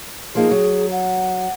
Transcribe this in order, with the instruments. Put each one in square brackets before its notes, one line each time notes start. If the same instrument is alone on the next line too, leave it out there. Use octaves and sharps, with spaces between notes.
[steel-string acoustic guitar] F3 A#3 D#4 [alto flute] G#4
[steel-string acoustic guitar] F#3
[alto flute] F#5